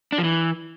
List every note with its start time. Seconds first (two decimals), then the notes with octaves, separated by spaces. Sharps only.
0.12 D4
0.18 F3
0.24 E3